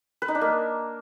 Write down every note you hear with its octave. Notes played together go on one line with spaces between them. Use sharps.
B4
D#4
D4
A#3